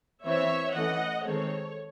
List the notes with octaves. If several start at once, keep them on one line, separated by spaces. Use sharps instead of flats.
E3 C4 C#5 E5
E3 A3 C#4 D#5 F#5
D#3 G#3 C4 A4 C#5